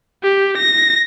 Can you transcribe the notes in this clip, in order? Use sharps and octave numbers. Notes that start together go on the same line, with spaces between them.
G4
A#6